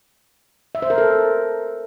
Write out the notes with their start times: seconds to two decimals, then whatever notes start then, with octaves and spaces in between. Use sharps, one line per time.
0.75 E5
0.82 C5
0.90 A#4
0.98 A4